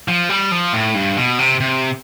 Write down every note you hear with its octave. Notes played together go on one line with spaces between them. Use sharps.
F3
G3
F3
A2
G2
B2
C3
C3